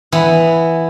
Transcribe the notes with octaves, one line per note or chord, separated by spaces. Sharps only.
E3 B3 B4